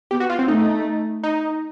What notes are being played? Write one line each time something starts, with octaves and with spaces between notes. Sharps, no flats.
B3 G4
F#4
F4
C4
A3 D#4
D#4